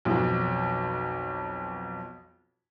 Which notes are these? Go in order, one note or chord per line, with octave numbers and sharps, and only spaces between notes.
B1 F2